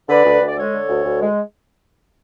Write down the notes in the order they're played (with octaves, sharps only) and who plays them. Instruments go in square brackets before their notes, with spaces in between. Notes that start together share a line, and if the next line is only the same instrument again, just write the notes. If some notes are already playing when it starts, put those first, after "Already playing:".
[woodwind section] D3 B4 D5
D2
D2
D5
G#3 A4 C#5
D3
D2
D2
G#3